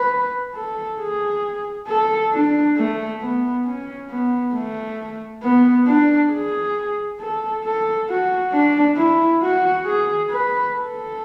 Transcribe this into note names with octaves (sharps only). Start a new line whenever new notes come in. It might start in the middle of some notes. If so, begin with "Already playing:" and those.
Already playing: B4
A4
G#4
A4
D4
A3
B3
C#4
B3
A3
B3
D4
G#4
A4
A4
F#4
D4
E4
F#4
G#4
B4
A4